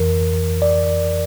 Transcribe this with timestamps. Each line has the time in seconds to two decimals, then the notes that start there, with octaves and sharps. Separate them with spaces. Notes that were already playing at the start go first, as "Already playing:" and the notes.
Already playing: F2 E3 A#4
0.62 D5